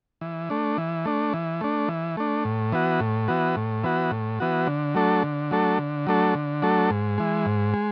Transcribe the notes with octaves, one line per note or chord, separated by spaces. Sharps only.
E3
A3 D4
E3
A3 D4
E3
A3 D4
E3
A3 D4
A2
E3 B3 F#4
A2
E3 B3 F#4
A2
E3 B3 F#4
A2
E3 B3 F#4
D3
F#3 A3 D4 A4
D3
F#3 A3 D4 A4
D3
F#3 A3 D4 A4
D3
F#3 A3 D4 A4
G#2
E3 G#3
G#2
G#3